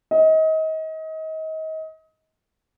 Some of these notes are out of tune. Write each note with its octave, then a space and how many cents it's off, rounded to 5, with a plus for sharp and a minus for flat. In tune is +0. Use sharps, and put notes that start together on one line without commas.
D#5 +30